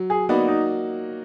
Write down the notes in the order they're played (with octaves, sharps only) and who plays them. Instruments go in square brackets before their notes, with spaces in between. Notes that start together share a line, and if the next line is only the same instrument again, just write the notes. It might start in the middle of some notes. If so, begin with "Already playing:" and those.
Already playing: [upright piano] F#3
[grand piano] G#4
[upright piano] A#3 D#4 F#4 D5 [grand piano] B3
[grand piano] D#4